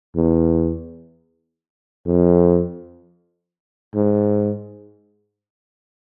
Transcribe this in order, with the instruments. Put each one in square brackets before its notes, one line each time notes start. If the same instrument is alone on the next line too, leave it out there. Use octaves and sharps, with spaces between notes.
[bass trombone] E2
F2
G#2